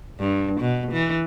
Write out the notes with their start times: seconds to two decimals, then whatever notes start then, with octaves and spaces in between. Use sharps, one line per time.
0.20 G2
0.61 B2
0.92 E3